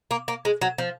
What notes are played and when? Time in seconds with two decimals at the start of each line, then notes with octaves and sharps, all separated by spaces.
0.11 A#3
0.28 A#3
0.45 G#3
0.61 F#3
0.78 F3